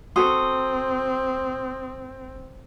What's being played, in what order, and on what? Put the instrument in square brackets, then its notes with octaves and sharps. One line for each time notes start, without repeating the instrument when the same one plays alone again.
[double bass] C4 [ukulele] F#4 A4 [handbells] C6 D#6